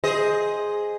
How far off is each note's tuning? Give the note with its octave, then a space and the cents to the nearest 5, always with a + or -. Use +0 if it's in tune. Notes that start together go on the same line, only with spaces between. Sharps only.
G#4 +0 C5 +0 D#5 +0